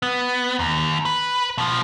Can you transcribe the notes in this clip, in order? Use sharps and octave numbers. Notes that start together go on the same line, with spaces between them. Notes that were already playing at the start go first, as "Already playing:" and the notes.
B3
D#2
B4
B2 F3